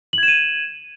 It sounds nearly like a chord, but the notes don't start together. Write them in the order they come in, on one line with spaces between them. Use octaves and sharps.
F#7 G#6 E7 D#7